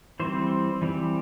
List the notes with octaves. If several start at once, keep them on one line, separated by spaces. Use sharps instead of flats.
E3 G3 C4 C5
E3 G3 C4